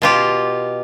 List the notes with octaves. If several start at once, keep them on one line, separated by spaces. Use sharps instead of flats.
B2 F4 G4